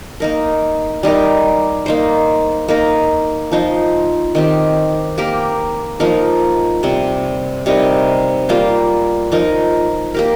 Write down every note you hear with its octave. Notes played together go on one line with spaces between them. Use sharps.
A#3 D#4 A#4
G3 D#4 G4 A#4
A#3 D#4 C5
A#3 D#4 A#4
F3 D#4 C5
D#3 C4 G4
A#3 G4 A#4
F3 A#3 D#4 A#4
C3 G3 C4
C3 G3 D#4 A#4
G3 A#3 F4 C5
F3 D#4 A#4
A#3 G4 A#4